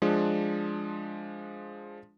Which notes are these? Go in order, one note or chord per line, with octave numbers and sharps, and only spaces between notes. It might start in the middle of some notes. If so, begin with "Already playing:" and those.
F3 G#3 D4